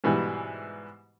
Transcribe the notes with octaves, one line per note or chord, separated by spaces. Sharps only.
G#2 B2 E3 G3